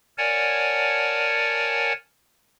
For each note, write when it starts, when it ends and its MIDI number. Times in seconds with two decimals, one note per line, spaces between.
0.18 1.93 70
0.18 1.93 73
0.18 1.93 74
0.18 1.93 78
0.18 1.93 80
0.18 1.93 81